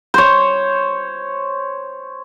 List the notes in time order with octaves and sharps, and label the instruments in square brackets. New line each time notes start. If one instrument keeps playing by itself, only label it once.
[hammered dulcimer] C5 C#5